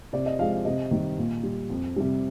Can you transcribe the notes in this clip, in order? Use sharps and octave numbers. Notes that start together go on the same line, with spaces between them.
C3 D5
D#5
F3 G#3 F5
F5
C3 D#5
D#3 G3
A#2
G3
F2
C3 G3